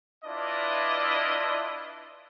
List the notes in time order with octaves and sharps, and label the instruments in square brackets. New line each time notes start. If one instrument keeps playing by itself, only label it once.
[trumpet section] D4 E4 F4 B4 D5 D#5